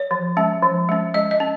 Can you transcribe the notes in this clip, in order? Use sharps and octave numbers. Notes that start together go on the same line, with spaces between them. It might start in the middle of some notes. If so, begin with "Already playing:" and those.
Already playing: C#5
F3
G#3 C#4
F3
G#3 C#4
G#3 D#5
D#5
C#4